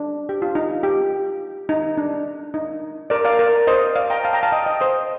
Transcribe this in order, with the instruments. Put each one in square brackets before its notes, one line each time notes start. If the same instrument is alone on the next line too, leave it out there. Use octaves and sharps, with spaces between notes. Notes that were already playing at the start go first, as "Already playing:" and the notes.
Already playing: [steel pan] D4
G4
F4
D#4
G4
D#4
D4
D#4
A#4 D5
D5 F5
A#4 D5
C5 D#5
D5 F5
G5 A#5
F5 A5
G5 A#5
F5 A5
D#5 G5
D#5 G5
C5 D#5